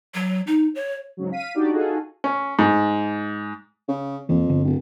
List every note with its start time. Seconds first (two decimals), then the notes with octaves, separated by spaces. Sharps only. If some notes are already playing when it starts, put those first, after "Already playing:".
0.14 F#3
0.47 D#4
0.75 C#5
1.17 G#2 C#3 F#3
1.31 F5 B6 D#7
1.54 D4 D#4 F#4 G4 D5
1.71 D#4 F4 F#4 G#4 A4
2.24 C#4
2.59 G#2
3.89 C#3
4.29 E1 F2 E3 A#3
4.49 G1 D3 B3
4.64 D1